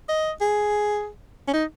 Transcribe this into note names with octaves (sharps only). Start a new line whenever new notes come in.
D#5
G#4
C#4
D#4